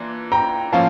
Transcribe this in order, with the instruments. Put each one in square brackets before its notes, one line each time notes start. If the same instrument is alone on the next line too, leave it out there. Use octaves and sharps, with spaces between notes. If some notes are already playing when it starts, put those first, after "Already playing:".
Already playing: [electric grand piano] E3 A#3 D4 F4
[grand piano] G5 A#5
[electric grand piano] A2 F3 A#3 C#4 [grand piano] F5 A5